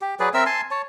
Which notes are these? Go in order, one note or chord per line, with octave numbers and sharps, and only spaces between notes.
G4
F#3 G#4 B4 D5
C4 A#4 E5 E6
G#5 A5 C6
C#5 A5